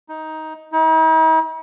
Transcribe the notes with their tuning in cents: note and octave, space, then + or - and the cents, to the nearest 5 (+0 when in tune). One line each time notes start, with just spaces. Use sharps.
D#4 +15
D#4 +45